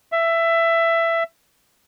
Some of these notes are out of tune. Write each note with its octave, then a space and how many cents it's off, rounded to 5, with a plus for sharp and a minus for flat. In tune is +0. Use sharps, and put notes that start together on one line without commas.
E5 +15